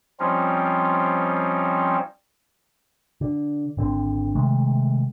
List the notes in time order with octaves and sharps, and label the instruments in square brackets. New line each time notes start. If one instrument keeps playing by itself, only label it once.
[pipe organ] F3 G3 C4 C#4 D#4 F4
[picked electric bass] D3
G#1 D3 C4
C3 D#3 G#3 A3